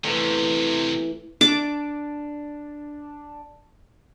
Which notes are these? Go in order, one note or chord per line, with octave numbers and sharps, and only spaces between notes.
C3 E3 A3 C#4
D4 D6